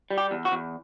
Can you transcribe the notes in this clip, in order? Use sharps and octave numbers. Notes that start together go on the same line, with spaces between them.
G3
G4
E2
F#4
E2